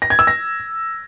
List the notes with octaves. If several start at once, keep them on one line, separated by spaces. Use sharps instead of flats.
A#6
G#6
E6
A#6